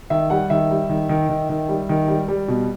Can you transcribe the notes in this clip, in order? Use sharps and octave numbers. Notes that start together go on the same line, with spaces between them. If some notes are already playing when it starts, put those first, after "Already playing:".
D#3 E5
G3 F#5
D#3 E5
G3
D#3
D#3
D#3
D#3
G3
D#3
G3
G3
B2